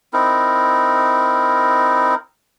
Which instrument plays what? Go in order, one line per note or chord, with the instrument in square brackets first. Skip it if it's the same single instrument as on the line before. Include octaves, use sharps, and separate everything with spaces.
[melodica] C4 D#4 E4 A#4